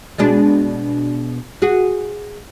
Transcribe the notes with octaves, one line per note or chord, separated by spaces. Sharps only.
B2 G#3 D4
F#4 G#4